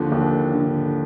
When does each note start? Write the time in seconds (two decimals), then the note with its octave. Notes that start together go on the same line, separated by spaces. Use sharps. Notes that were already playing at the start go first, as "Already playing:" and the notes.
Already playing: D#2 D3 F3
0.12 D#2
0.53 D3